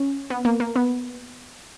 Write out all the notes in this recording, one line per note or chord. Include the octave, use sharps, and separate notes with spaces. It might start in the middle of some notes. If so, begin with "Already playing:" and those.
Already playing: C#4
B3
A#3
A#3
B3